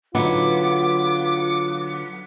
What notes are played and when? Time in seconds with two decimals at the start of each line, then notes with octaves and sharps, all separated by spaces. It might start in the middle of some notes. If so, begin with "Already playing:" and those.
0.15 D3 F#3 B3 D#4 F4 D6